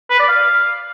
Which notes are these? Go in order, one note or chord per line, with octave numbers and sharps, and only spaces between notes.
B4
D5
F5